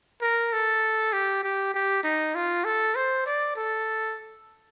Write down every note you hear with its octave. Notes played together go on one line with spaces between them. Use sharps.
A#4
A4
G4
G4
G4
D#4
F4
A4
C5
D5
A4